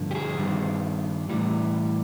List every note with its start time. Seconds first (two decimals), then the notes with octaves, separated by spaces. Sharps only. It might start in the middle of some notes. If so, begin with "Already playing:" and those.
Already playing: G2 D3 F3
0.11 G4
0.15 G#4
0.38 G2 D#3 G3
1.29 A2 E3 G3